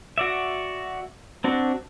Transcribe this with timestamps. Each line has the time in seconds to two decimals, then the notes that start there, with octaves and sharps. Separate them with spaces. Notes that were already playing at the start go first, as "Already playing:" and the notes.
0.18 F#4 D5 E5
1.44 C4 D4 F#4